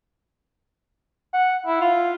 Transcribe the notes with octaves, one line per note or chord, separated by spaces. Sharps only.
F#5
E4
F4